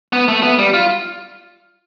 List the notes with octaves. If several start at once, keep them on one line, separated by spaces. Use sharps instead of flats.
B3
A3
B3
G3
F4